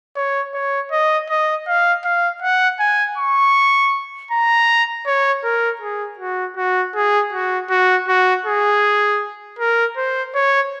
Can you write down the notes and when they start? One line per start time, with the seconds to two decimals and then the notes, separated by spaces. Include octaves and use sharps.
0.16 C#5
0.54 C#5
0.92 D#5
1.29 D#5
1.67 F5
2.05 F5
2.42 F#5
2.80 G#5
3.18 C#6
4.31 A#5
5.06 C#5
5.44 A#4
5.82 G#4
6.19 F#4
6.57 F#4
6.95 G#4
7.33 F#4
7.70 F#4
8.08 F#4
8.46 G#4
9.59 A#4
9.97 C5
10.35 C#5